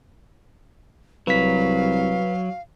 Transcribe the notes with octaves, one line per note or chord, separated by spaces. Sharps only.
C2 F#3 B4 F5 B6